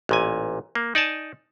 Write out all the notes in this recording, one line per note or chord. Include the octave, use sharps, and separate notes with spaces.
A1 A#2 G#5
A#3
D#4 D5 G#5 A5